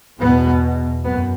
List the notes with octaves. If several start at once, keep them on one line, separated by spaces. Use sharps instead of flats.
E2 B2 B3
F#2 B3